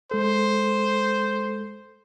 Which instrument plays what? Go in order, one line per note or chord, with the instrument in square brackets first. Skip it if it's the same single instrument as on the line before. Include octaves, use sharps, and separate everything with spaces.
[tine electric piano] G#3 A4 [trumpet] C5